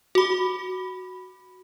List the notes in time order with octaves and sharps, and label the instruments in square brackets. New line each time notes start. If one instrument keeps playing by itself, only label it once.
[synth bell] F#4 B5